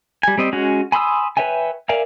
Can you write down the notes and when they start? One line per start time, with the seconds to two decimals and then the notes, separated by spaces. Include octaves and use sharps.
0.23 G3 G#5
0.38 G3 C4 D#5
0.53 G#3 C#4 F#4
0.92 G#5 B5 C6 D#6 E6
1.37 B4 C#5 E5 G5 G#5
1.89 A#4 D5 E5 F5 G#5